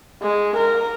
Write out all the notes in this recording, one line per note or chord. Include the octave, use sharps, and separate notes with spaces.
G#3
A#4